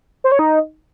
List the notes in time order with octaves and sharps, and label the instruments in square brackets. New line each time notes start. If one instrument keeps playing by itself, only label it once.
[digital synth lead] C5
C#5
D#4